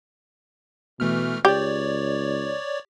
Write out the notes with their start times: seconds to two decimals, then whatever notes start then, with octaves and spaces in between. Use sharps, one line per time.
1.00 B2 E3 A3 F6
1.45 C#2 G4 C#5 D5